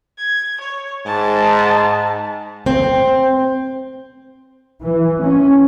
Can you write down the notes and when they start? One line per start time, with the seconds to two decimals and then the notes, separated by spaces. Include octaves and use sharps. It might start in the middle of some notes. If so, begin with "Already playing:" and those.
0.18 G#6
0.61 C#5
1.06 G#2 A5
2.66 C4
4.84 E3
5.22 C#4